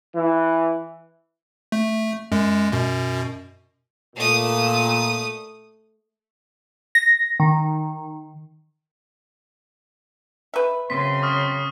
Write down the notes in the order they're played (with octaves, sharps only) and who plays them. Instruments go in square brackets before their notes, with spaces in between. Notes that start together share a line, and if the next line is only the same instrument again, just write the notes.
[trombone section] E3
[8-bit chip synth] A3
F#2 G#3
F#2 B2
[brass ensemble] A#2 [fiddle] A3 D#6
[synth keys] A#6
D#3
[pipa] B4 E5
[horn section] F#2 C4 C6 [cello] C#3 [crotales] B6
[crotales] C#6 D#6 F6